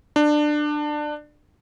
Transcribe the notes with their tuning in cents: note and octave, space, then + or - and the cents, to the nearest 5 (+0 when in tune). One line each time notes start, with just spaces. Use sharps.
D4 +20